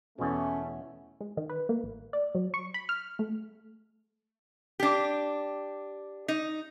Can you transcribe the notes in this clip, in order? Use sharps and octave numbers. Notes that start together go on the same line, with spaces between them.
E2 B2 A3 C#4
G#3
D#3
B4
A#3
A1
D5
F#3
C#6
B5
F6
A3
D4 G4
D#4